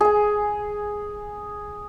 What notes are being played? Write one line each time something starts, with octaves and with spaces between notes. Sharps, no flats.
G#4 G#5